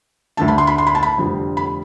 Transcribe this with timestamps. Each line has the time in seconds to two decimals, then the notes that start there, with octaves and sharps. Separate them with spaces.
0.37 D2 D3 A3 A5
0.48 B5
0.58 C6
0.67 B5
0.78 C6
0.87 B5
0.95 A5
1.03 B5
1.17 F1 F2 D3 G3
1.57 B5